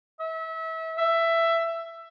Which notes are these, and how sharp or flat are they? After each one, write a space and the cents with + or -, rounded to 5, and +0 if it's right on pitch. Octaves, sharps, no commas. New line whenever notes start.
E5 -30
E5 +15